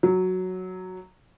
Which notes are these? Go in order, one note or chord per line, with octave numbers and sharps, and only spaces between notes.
F#3